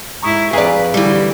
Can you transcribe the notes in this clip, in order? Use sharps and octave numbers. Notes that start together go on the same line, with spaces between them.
G#2 E4 A#5 C#6 D#6
F2 G#4 B4 D5 F5 A#5 C#6
D3 E3 G3